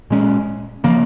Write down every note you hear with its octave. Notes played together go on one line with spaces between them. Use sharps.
A#2 G#3 C#4
C#3 F3 A#3